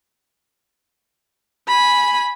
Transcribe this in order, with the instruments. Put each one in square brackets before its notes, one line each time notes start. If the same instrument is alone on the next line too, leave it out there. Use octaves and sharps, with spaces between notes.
[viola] G#5 B5